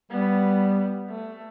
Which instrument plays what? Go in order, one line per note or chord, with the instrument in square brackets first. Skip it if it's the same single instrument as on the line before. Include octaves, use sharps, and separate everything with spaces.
[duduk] G3 [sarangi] B3
[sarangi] A3